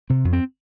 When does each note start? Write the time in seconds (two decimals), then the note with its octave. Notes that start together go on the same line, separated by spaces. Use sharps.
0.10 C3 C4
0.25 F2
0.33 C4